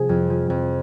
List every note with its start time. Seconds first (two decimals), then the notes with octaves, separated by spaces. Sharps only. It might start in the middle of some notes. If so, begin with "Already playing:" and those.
Already playing: C3 F3 G#4
0.09 F2
0.30 F3
0.50 F2